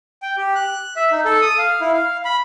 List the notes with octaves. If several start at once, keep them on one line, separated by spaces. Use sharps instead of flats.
G5
G4
F#6
E5
D#4
A4
D#6
F5
E4
F5
B5